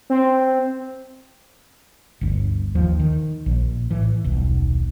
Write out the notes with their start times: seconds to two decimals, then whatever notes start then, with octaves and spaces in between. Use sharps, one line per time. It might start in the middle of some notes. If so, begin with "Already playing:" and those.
0.10 C4
2.21 G1 D2
2.75 D#2 F3
2.99 D#3
3.46 A#1
3.91 A2 E3
4.24 D#1 B1